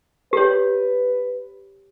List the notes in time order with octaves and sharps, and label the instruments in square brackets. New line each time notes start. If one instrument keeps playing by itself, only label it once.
[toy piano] G4 C#5 [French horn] B4